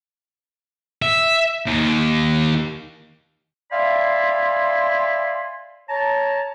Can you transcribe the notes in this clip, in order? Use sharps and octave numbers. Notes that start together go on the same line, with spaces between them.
E5
D#2
D5 E5 F5 G#5 B5 C6
C#5 A5 A#5